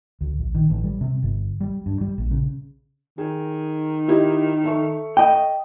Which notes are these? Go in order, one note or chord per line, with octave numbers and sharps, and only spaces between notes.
D2
A#1
D#3
A1
G3
C3
G1
G3
G2
G3
A#1
C#3
D#3 G#4
E4 G4 D#5
A4 E5 C#6
D#5 G5